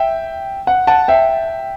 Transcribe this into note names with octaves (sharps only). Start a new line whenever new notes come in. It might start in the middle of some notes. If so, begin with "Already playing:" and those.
Already playing: E5 G5
F#5
F#5 A5
E5 G5